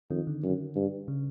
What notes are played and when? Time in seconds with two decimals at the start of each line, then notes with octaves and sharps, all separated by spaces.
0.10 F2 D#3
0.27 D3
0.43 F#2
0.76 G2
1.08 C#3